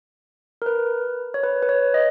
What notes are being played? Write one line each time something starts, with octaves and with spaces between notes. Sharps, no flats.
A#4
B4
C#5
B4
B4
C#5
D#5